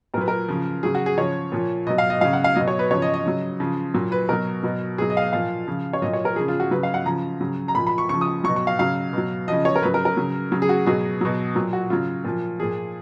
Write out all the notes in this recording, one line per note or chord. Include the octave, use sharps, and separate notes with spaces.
A#2 F#3 A#4 B4
A#4
C#3 F3
C#3 F#3 G#4
F#4
G#4
C#3 F3 C#5
A#2 F3
B2 F#3 D#5
F5
D#5
C#3 F#3 F5
F#5
F5
B2 F#3 D#5
C#5
B4
C#3 F3 C#5
D#5
D#5
C#3 F#3
C#3 F3
A#2 F#3
B4
B2 F#3 A#4
B2 F#3
B2 F#3 G#4
D#5
F5
D#5
A#2 F3 F5
C#3 F3
C#5
A#2 F#3 D#5
C#5
A#4
C#3 F3 G#4
F4
F#4
C#3 F#3 B4
F5
F#5
C#3 F3 A#5
C#3 F#3
A#5
A#2 F3 B5
B5
C#6
C#3 F3 C#6
D#6
B2 F#3 C#6
C#6
F5
C#3 F#3 F5
B2 F#3
C#3 F3 D#5
C#5
A#4
C#3 F#3 B4
A#4
A#4
C#3 F#3
C#3 F#3
G#4
F#4
B2 F#3 G#4
B2 F#3
A#2 F#3
F#4
C#3 F#3 F4
A#2 F3
A#2 F3 G#4